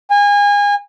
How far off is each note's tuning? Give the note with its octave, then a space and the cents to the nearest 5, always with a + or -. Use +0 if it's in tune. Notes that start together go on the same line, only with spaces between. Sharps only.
G#5 -30